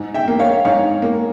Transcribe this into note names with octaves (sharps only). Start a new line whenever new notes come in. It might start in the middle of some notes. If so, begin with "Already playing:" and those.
Already playing: G#2
E5 G5
A#3
C#5 F5
G#2 C#5 F5
A#3